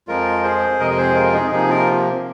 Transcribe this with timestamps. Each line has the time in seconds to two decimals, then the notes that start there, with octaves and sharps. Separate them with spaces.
0.08 F2 F3 G#3 F4 A#4
0.43 G#4 C5
0.79 F2 C3 G#3 A#4 D#5
0.91 D#5
0.97 G#4 C5
1.15 F4 A#4
1.33 D#4 G#4
1.51 C3 F3 A#3 D#4 G#4
1.69 F4 A#4